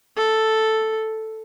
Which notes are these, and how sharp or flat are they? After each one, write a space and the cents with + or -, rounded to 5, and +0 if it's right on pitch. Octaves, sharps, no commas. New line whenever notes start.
A4 +0